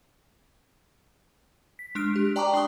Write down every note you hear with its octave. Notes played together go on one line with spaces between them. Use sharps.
B6
G#3 D4 F6 D7
G4
D5 G5 A5 A#5 C#6 D6
D4 C6 C#6 D#6 G7